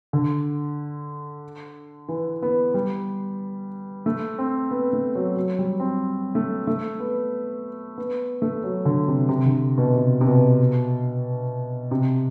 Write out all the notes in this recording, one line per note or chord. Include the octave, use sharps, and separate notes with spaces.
D3
E3
B3
G3
A3
C4
B3
A3
F#3
F#3
G3
C4
A3
A3
B3
B3
A3
F#3
D3
C3
C3
D3
B2
C3
C3
B2
C3